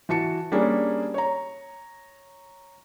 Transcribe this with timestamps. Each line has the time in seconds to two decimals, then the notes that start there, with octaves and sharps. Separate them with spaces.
0.09 E3 F#4 A5 C#7
0.52 G3 A#3 C#4 D4 G#4
1.14 C#5 A#5